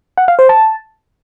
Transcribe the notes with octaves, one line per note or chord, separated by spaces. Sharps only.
F#5
F5
C5
A5